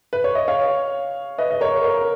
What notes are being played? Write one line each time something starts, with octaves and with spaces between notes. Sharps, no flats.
B4
C#5
D#5
C#5 F5
B4 D#5
D#5
A#4 C#5
A#4